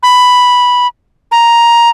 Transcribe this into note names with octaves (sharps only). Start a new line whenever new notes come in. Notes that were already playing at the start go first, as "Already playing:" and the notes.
B5
A#5